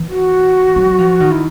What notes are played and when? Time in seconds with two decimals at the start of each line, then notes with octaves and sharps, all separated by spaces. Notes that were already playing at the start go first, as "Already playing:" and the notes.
Already playing: E3
0.09 F#4
0.76 F#3
0.99 F3
1.20 D#3
1.32 E4